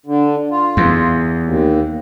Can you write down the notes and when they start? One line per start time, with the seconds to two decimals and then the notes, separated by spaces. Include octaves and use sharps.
0.06 D3
0.51 F4
0.77 E2
1.43 D#2